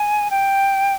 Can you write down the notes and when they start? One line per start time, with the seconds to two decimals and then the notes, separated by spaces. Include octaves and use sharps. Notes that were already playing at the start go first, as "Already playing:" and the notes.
Already playing: G#5
0.31 G5